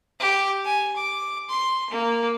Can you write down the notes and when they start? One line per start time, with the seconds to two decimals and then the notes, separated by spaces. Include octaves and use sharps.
0.20 G4
0.65 G#5
0.96 D6
1.49 C6
1.90 A#3